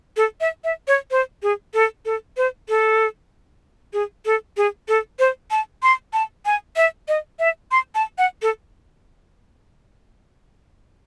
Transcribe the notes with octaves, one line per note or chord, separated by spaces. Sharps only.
A4
E5
E5
C#5
C5
G#4
A4
A4
C5
A4
G#4
A4
G#4
A4
C5
A5
C6
A5
G#5
E5
D#5
E5
C6
A5
F#5
A4